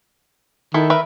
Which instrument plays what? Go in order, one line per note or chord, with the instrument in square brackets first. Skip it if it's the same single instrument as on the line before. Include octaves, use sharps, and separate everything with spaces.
[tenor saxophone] D#3 [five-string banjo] E4 A4
[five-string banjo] A#4 B4 E5